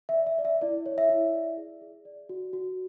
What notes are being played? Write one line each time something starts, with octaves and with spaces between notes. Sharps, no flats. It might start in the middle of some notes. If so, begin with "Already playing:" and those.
E5
D5
E5
D5
E5
E4 D5
C#5
E5
E4
D5
G#4
G#4
D5
F#4
F#4